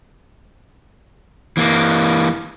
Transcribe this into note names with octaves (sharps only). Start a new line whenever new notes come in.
E3 A#3